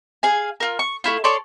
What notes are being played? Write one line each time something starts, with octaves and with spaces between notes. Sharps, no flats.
G#4 F5 G#5
F4 A#4
C#6
A3 E4 F4
A4 C#5 D5 C6